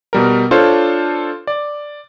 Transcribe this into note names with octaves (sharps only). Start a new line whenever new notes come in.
B2 G3 A#4
D4 F4 A4 C5 C#5
D5